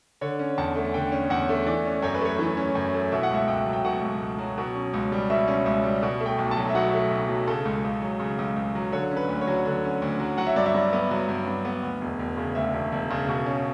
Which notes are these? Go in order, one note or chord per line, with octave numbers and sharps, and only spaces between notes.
D3 C#5
C#4
E2 A5
A3
D3 G5
C#4
E2 F#5
A3
E3 D5
C#4
F#2 C#5
B4
A3 C#5
E3
C#4
F#2
A3
B2 E5
F#5
C#2 E5
C#2 G5
F#3
G5
B2 F#5
C#2
C#2
F#3
B2
C#4
C#2
G3
B2 E5
C#4
C#2 E5
G3
B2
A3
G5
B1
A5
F#3
E5
B2 F#5
A3
B1
F#3
C#3 A4
C#2
C#2
F#3
C#3
C#2
C#2
F#3
D3 C#5
C#4
B4
D2
C#5
F#3
D3
C#4
D2
F#3
F#3 F#5
E5
G2 D5
E5
G2
B3
F#3
G2
G2
B3
D2
E1
E1
C#3
D2 E5
E1
E1
C#3
B2
C#4